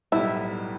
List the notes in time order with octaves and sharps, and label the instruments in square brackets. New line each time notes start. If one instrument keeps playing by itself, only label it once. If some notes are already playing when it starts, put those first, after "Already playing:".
[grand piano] B1 A2 G3 B3 [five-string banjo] E4